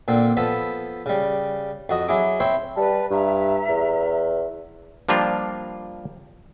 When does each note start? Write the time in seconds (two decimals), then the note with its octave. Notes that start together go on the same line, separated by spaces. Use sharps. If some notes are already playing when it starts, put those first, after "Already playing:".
0.08 A#2 D3 C4
0.37 F3 B3 A4 A5 B5
1.06 C#3 G3
1.89 F2 F#4 D#5
2.08 F#3 E4 G#4 D6
2.40 C4 E4 C5 C#5
2.77 G3 B4 A5
3.11 G2 E5 A#5
3.69 E2
5.09 F3 G3 A#3 D4 F4